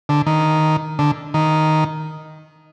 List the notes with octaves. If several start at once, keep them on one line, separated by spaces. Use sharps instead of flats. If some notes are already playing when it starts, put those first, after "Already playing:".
D3
D#3
D3
D#3